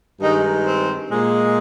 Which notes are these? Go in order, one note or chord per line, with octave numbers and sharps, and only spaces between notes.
G2 D#3 G#3 D#4
C4
A#2 G#3